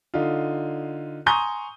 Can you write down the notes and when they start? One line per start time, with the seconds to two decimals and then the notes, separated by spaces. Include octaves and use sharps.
0.14 D3 D#4 F4
1.26 G#5 A#5 C6 C#6 D#6 G6